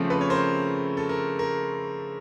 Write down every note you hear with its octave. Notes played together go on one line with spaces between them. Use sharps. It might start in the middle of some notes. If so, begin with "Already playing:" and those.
Already playing: C#3 F3 A3 C4
A4 B4
C#5
A#4 C5
A4
A#4
A#4